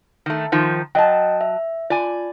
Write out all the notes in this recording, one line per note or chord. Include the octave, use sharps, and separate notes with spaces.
D#3 A3
D#3 F3
F#3 D#5 G5 A5
E5
F4 D5 G#5